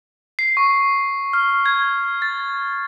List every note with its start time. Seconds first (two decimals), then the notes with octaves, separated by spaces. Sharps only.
0.39 C7
0.57 C#6
1.33 F6
1.66 G#6
2.22 A6